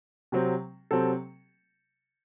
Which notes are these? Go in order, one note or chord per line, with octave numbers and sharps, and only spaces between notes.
C3 F#3 C4
C3 F#3 C4 A4